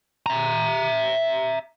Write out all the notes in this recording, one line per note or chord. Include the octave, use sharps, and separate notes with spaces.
E5 A#5